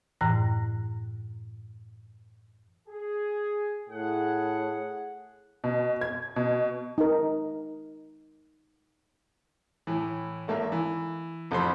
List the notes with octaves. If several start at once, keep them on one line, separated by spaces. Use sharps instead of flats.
F#2 A2 E3 F#6 A#6
G#4
A2 G#4 F#5
B2
G#6
B2
D#4 A#4
A2 E3
G#1 A3 A#3 E5
E3
A1 F2 A4 C5 B5 C6